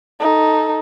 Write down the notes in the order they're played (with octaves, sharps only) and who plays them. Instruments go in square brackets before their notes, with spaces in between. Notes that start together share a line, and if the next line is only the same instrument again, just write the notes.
[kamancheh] D#4 A4